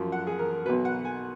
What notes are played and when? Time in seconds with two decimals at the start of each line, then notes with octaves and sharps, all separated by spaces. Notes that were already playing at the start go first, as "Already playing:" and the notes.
Already playing: F#2 F3
0.12 F#5
0.27 G#4
0.39 A#4
0.65 B1 B2 F#3 B4
0.85 F#5
1.05 G#5